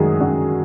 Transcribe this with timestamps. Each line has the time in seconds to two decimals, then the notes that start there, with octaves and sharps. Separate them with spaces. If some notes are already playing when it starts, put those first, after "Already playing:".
Already playing: F#2 D#3 G#3 F#4 G#4
0.20 F#2 F#3 F#4